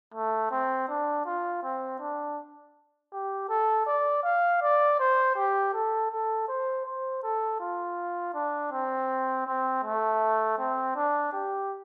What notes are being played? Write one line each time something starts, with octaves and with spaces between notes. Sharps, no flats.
A3
C4
D4
F4
C4
D4
G4
A4
D5
F5
D5
C5
G4
A4
A4
C5
C5
A4
F4
D4
C4
C4
A3
C4
D4
G4